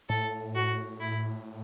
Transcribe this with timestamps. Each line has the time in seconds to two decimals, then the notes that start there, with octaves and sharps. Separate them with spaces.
0.09 A2 A4
0.55 F#4
1.00 E4